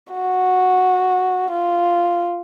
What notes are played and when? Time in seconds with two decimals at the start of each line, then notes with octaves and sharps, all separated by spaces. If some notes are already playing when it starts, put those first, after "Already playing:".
0.12 F#4
1.51 F4